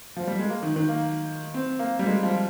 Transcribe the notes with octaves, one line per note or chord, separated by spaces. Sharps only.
F3
G3
G#3
A#3
D#3
D#3
A#3
C4
A#3
G3
G#3
F3